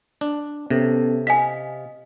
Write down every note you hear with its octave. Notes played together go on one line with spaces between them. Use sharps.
D4
C3 B3 C#4 A4
D#5 F5 G#5 B6